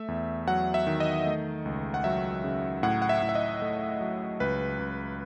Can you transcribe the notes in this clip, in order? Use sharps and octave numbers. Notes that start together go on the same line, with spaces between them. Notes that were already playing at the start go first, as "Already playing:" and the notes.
Already playing: A3 E5
E2
F#3 F#5
E5
D#3
D#5
A3
C#2
F#5
F#3 E5
C#3
A2 F#5
F#5
E5
A2
E5
D#5
A3
F#3
C#2 B4
C#2